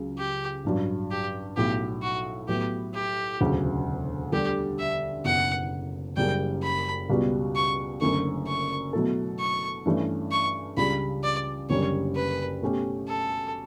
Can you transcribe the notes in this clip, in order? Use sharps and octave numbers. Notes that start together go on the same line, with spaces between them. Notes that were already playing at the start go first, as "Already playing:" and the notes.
Already playing: C#2 C#3 F#3
G4
A1 G2 F#3
G4
B1 A2 F#3 G4
F#4
A2 F#3 B3 E4 G4
G4
E1 D2 C#3 F#3
D2 D3 G3 D4 G4 A4
E5
F#1 E2 B2 F#5
F#1 F#2 C#3 G3 G5
B5
C#2 B2 G3 B3 F#4
C#6
F#1 F#2 D3 A3 C#6
C#6
B2 F#3 A3 E4 A4
C#6
G2 E3 A3 C#4
C#6
C#2 C#3 G3 D4 B5
D5
F#1 F#2 D3 G3 C#4 C#5
B4
B2 A3 C#4 G4
A4